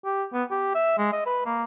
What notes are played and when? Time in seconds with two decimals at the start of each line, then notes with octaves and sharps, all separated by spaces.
0.05 G4
0.33 B3
0.50 G4
0.75 E5
0.98 G#3
1.12 D#5
1.26 B4
1.46 A#3